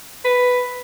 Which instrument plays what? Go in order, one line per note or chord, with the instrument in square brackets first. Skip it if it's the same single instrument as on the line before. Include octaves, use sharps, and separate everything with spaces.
[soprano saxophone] B4